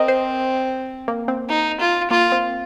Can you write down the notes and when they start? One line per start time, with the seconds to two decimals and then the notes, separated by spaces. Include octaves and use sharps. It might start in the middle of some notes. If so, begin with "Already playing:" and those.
Already playing: C4 A#4 D#5
0.08 C5
1.08 A#3
1.28 C4
1.50 D#4
1.80 F4
2.11 A#3 F4
2.32 C4